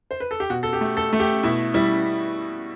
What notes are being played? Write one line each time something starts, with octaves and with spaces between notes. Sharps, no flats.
C5
B4
A4
G4
B2 F#4
A4
G4
A3
A4
A3
G4
B2 E4
G3 E4